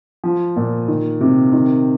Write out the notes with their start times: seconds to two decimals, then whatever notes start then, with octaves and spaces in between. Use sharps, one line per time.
0.24 F3
0.56 A#2
0.88 D#3
1.21 C3
1.53 D#3